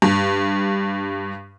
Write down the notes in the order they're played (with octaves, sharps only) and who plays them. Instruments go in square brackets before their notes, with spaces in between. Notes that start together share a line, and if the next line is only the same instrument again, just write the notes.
[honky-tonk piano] G2